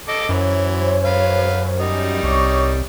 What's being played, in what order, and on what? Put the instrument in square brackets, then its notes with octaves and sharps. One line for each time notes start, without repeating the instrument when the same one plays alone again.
[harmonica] A4 D#5 D6
[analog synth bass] F#2 [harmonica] E3 [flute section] C5 C#5
[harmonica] B4 F5
G3 D#4
[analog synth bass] C2 [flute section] C#5 C#6 D6